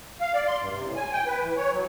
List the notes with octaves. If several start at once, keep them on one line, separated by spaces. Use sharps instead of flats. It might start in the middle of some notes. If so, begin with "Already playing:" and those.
F5
D5
C6
G2
C3
A2
G#5
G5
B4
E3
C#5
F#3